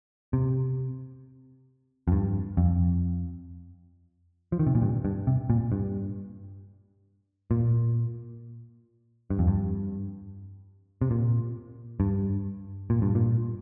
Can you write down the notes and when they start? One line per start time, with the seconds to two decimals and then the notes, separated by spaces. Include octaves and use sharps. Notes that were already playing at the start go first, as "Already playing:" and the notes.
0.33 C3
2.08 F2
2.12 G2
2.57 F2
4.52 F3
4.59 D#3
4.67 C3
4.75 A#2
4.82 G2
5.05 G2
5.27 C3
5.50 A#2
5.72 G2
7.51 A#2
9.30 G2
9.39 F2
9.47 G2
11.02 C3
11.11 A#2
12.00 G2
12.90 A#2
13.02 G2
13.15 A#2